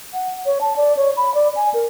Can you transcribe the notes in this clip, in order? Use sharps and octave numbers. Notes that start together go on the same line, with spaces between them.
F#5
C#5
A5
D5
C#5
B5
D5
G#5
A#4